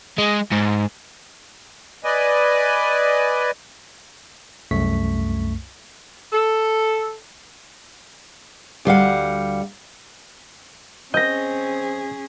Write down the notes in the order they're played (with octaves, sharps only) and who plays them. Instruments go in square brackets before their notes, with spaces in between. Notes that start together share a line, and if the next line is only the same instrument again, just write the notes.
[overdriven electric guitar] G#3
G#2
[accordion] B4 D5 D#5 G#5
[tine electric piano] C2 F#2 A3 C#6 B6
[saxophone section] A4
[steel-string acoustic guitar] D2 G3 F5 F#5
[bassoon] C4 [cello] C#4 G#4 [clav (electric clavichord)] D#5 [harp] G6 A#6